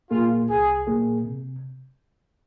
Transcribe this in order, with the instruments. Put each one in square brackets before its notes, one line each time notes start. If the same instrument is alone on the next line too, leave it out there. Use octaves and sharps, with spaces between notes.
[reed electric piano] A#2 A#3 G#4 [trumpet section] F4
[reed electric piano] C2 [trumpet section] G#4
[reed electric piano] A#2 A#3 G#4
C3